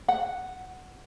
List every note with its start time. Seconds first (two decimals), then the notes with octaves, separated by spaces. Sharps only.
0.08 F#5